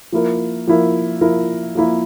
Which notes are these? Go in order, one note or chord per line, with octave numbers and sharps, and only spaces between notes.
F3 A#3 E4 A#4
F3 A#3 E4 A#4
F3 A#3 E4 A#4
F3 A#3 E4 A#4